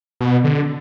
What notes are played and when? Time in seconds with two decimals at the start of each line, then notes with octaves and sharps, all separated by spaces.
0.21 B2
0.44 D3